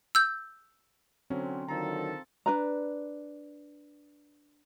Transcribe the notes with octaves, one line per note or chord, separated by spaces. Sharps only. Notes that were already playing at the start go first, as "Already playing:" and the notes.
E6 G6
D3 F#3 C4 C#4
D3 D#3 F3 F#3 A4 A#5
D4 B4 A#5